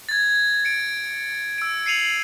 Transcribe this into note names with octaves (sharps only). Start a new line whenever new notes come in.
G#6 A6
C#7 D7
E6 D7
C7 C#7 D#7 F7 F#7